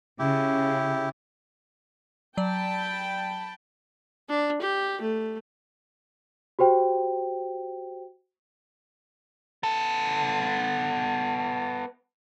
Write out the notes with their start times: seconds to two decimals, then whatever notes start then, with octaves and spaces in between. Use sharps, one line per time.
0.19 C#3 E4 G4
2.37 F#3 D5 G5 A5 B5
4.29 D4
4.61 G4
5.01 A3
6.59 F#4 G4 C5 G5
9.63 B3 A4